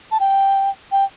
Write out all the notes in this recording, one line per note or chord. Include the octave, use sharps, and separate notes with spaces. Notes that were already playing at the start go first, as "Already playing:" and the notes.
A5
G5
G5